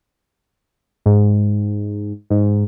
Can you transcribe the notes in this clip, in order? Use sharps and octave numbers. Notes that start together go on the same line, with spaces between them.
G#2
G#2